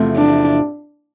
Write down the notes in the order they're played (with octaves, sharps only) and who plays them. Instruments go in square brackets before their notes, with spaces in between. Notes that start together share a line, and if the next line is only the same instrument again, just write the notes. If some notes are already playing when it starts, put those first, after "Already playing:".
Already playing: [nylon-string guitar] E2 C3 F3 A3
[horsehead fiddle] D4